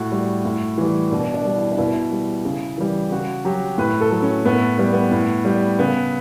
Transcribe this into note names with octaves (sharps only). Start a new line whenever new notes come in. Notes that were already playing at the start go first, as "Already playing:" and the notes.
Already playing: A2 F#4
G3
A2
E3 G3
B2 D4
D4
G3
E4
D4
B2 E4
G3
C#3
E3 G3
C#3 F#4
F#3 G4
A2 B4
A4
F#3
C#4
A2 B3
G3 B3
B3
A2
G3
C#3 B3